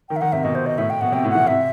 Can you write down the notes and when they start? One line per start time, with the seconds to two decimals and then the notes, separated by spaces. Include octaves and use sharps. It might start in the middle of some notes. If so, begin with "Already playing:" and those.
0.09 D#3 G5
0.16 E5
0.21 D#3 F#5
0.32 C3 E5
0.44 B2 D#5
0.55 C5
0.66 D#5
0.78 A2 E5
0.90 G5
1.01 B2 F#5
1.12 C3 G5
1.24 A2
1.29 F#5
1.35 E3
1.46 C3 E5